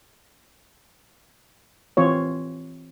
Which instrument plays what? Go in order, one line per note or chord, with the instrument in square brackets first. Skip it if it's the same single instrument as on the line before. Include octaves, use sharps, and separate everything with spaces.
[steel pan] E3 C4 F4 C#5